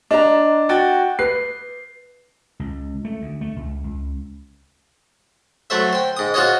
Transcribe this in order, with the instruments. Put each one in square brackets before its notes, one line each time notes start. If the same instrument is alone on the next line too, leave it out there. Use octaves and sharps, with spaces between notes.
[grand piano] D4 [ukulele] D#5 A#5
[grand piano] F#4 G5 A6
[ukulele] B4 [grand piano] C7
[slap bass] C#2
A3
D2
A3
C#2
C#2
[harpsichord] F#3 A3 C5 E5
C5 G5
G#2 D#6
F4 F#4 G#4 C5 C#5 D#5